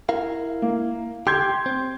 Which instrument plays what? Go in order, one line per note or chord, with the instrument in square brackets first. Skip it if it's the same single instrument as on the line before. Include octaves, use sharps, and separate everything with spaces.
[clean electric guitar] E4 A#4 F5
[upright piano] A#3
[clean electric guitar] G4 [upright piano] C6 G6 G#6
[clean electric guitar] C4